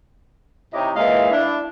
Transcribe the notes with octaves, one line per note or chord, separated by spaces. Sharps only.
C3 D#4 E4 G4 C#5 D#5
A#2 E3 G#3 D#5 F5
D4 E4